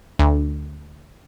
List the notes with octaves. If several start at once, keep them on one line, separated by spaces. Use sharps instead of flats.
D2